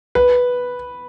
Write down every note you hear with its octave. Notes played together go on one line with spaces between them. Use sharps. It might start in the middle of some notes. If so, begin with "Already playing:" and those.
B4